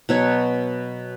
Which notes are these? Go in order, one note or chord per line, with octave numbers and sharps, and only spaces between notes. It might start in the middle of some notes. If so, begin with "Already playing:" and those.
B2 F#3 C#5